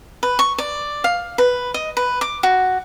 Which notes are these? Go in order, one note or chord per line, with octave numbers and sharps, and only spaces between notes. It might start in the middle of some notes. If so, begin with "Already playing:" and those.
B4
C#6
D5
F5
B4
D#5
B4
D6
F#4